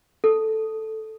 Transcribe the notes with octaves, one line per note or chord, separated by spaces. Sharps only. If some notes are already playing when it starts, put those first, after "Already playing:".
A4